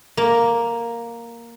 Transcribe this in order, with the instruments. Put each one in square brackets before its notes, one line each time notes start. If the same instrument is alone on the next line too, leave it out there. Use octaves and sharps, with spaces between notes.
[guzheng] A#3